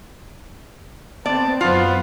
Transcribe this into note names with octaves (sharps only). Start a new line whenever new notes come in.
B3 C4 D5 A5
F#2 F#3 B3 F4 C5